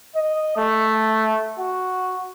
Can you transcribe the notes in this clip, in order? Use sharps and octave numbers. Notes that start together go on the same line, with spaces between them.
D#5
A3
F#4